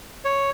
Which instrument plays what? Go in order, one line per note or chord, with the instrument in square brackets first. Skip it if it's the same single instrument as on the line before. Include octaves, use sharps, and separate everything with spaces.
[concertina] C#5